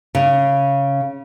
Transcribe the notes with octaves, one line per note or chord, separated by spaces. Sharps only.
C#3